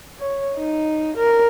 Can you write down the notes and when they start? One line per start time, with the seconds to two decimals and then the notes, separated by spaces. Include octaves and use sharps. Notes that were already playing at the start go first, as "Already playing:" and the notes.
0.20 C#5
0.58 D#4
1.17 A#4